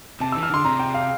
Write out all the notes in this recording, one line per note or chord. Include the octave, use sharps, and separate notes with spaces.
C3 A5
E3 E6
F6
D3 C6
C3 A#5
G5
F5